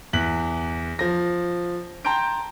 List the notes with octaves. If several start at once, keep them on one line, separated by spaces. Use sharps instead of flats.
E2 F#6 B6 F#7
F3 A#6
G5 A5 A#5 C6 G6 D7